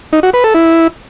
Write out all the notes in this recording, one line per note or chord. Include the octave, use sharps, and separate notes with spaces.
D#4
F#4
B4
A4
E4